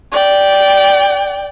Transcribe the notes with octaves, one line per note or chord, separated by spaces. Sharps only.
D5 G5